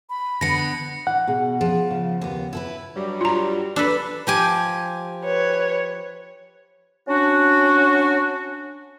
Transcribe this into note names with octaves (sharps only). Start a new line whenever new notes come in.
B5
D3 B3 A#6 C#7
E3 F#5
B2 G#4
F3 C#4 G#4
C#3
D#2 B3
E4 A4 B4
G2 F#3 G3
F4 A#5
D4 A4 B4
F3 G4 G#5
B4 C#5
C#4 D4 F#4